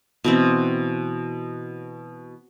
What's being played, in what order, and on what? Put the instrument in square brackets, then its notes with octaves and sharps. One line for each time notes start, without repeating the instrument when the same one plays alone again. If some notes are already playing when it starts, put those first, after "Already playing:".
[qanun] B2 E3 C4